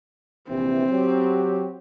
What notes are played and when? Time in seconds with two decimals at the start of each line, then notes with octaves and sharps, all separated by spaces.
0.49 A#1 C3 E3 C4
0.90 F#3 G4